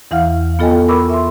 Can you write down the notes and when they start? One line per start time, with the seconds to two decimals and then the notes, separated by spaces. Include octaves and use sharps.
0.11 E2 E3 E4 F5 F#5 F6
0.59 B3 F4 A4 D#5 G5 G#5
0.89 A#4 B5 C#6 D6 E6
1.10 E5 C6